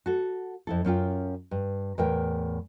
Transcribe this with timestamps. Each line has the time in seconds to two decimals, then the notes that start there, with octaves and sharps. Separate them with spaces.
0.06 F#4 A4
0.67 F2 E4 A4
0.85 F#2 C#4 F4 G5
1.51 G2
1.98 E2 A2 A#4 G5